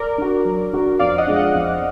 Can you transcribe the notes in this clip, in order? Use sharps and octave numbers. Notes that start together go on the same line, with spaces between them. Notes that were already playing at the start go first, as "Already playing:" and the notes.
Already playing: A#4 D5
D4 F#4
F#3
D4 F#4
F2 D5 F5
D#5 F#5
F3 G#3 D4
D#5 F#5
F2